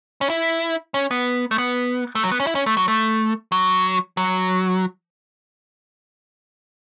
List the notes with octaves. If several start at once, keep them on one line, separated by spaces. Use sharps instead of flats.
C#4
E4
C#4
B3
A3
B3
A3
F#3
B3
C#4
E4
C#4
A3
F#3
A3
F#3
F#3